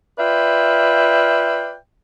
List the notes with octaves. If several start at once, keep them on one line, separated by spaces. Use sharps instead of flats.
F4 B4 D5 E5 F5 G5